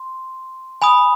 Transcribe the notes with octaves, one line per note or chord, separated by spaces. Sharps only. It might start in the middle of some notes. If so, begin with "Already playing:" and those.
Already playing: C6
G#5 B5 D#6